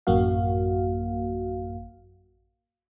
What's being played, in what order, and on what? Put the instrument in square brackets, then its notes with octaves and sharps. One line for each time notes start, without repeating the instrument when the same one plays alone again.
[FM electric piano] A1 F#2 A#3 F#4 F5